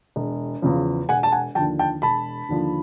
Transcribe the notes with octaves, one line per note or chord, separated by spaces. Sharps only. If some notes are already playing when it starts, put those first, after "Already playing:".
E1
E2 C#3 F3
E1 F#5 G#5
A5
F#5 G#5
D#2 D3 F3 G5 A5
G5 A5
E1 A5 B5
D#2 D3 F3